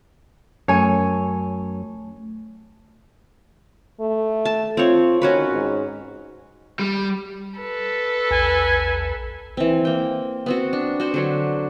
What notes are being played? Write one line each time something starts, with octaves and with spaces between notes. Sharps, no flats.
F#2 A3 C#5 G#5
A3
A5
C4 F4 C#5
D#3 C#4 F#4 B4
G#2
G3
A4 B4
A#1 E2 G#5
E3 C4
A#3 G5
B3 C4 F#4
D4
F#4 C5
D3 F#3 D4